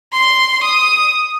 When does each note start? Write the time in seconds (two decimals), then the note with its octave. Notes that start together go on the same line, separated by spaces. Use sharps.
0.13 C6
0.63 D#6